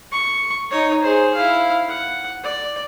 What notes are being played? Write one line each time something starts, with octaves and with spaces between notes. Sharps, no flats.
C#6
D#4 C#5
G#4 C5
E4 F5
F#5
D5